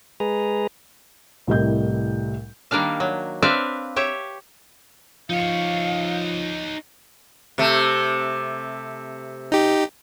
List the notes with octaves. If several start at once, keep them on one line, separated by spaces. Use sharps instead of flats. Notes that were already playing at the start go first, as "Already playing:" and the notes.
G#3 G#4 B4 A#5
C2 A2 G3 A#4 D#5 G6
D#3 G3 A#3 D4 F5
F#3
C4 D4 B4 D5 E5 F5
G4 C#5 E5
F3 D#4 C#5 F5
C3 A3
D#4 G4